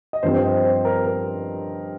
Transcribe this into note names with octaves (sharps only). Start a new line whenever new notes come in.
D#5
G2 F3 C4 C5
C5
D#5
C5
A#4
A#4